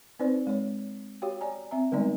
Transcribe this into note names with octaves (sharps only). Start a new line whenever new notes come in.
C4 D#4 B4 C5 D5
G#3 C#5
F#4 G4 C#5 F5 G5
C#5 D5 G#5 A#5
C4 E5 A#5
D3 G3 G#3 B3 D#4 D5